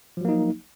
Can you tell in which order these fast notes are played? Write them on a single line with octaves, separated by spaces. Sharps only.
F3 F#3 A#3 D#4